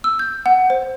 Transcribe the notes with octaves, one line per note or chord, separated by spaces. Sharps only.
E6
G6
F#5
C5